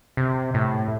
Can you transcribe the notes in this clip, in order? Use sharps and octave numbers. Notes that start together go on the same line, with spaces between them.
C3
A2